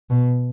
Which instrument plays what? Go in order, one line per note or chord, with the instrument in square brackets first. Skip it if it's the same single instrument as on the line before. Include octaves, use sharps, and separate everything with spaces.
[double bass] B2